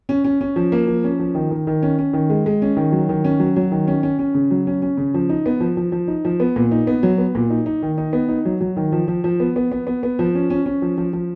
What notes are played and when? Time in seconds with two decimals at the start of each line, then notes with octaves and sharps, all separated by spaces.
0.09 C#4
0.24 C#4
0.41 C#4
0.56 F3
0.72 A#3
0.87 F3
1.04 C#4
1.19 F3
1.35 D#3
1.51 D#3
1.67 D#3
1.83 C#4
1.98 C#4
2.13 D#3
2.30 G#3
2.46 G#3
2.62 C#4
2.77 D#3
2.92 F#3
3.09 D#3
3.25 C#4
3.40 F#3
3.56 F#3
3.72 D#3
3.88 C#4
4.03 C#4
4.19 C#4
4.34 C#3
4.51 F#3
4.67 C#4
4.82 C#4
4.97 C#3
5.14 F3
5.29 D#4
5.46 B3
5.60 F3
5.77 F3
5.92 F3
6.08 D#4
6.25 F3
6.40 B3
6.56 A#2
6.72 D#4
6.87 B3
7.03 F#3
7.18 B3
7.35 A#2
7.50 D#4
7.66 D#4
7.82 D#3
7.98 D#4
8.13 B3
8.29 D#4
8.45 F#3
8.61 F#3
8.77 D#3
8.92 F3
9.08 F3
9.24 F3
9.40 B3
9.56 B3
9.72 B3
9.87 B3
10.03 B3
10.19 F3
10.35 C#4
10.50 C#4
10.66 C#4
10.82 F3
10.98 F3
11.13 F3